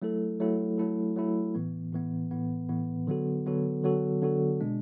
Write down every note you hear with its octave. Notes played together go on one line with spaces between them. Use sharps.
F#3 A3 E4 A4
F#3 A3 E4 A4
F#3 A3 E4 A4
F#3 A3 E4 A4
A2 E3 B3
A2 E3 B3
A2 E3 B3
A2 E3 B3
D3 F#3 B3 F#4 A4
D3 F#3 B3 F#4 A4
D3 F#3 B3 F#4 A4
D3 F#3 B3 F#4 A4
B2 G#3 D4